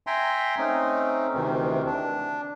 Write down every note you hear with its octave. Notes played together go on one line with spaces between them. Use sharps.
E5 G5 G#5 A#5 C6
A3 C4 C#4 D#4
D2 C3 D#3 E3
D4